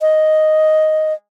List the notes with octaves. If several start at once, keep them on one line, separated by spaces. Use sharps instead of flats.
D#5